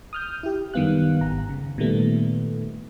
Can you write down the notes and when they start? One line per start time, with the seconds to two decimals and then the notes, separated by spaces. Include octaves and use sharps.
0.13 D#6 F6 G6
0.43 E4 G4
0.74 F#2 D#3 G3 B3 F5 F#6
1.21 G#1 A#5
1.49 C#3
1.78 A#2 D#3 G3 A3 B3